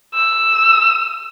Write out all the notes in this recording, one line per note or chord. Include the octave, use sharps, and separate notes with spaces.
E6